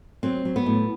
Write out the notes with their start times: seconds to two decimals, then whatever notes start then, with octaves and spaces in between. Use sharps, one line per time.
0.23 F#3 C4
0.45 F#3
0.56 B3
0.66 A2